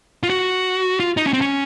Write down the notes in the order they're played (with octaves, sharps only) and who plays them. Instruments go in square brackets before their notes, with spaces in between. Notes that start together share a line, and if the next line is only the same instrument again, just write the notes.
[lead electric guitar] F4
F#4
F4
D#4
C#4
C4
C#4